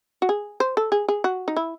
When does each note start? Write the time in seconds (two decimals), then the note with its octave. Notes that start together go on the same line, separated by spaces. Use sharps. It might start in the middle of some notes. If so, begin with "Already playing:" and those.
0.22 F#4
0.29 G#4
0.60 C5
0.77 A4
0.92 G#4
1.08 G#4
1.24 F#4
1.48 D#4
1.56 E4